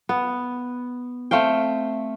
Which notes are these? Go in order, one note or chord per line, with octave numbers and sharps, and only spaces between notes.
B3
A3 C4 F5 G5